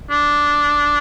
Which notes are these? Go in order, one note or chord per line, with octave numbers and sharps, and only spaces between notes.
D4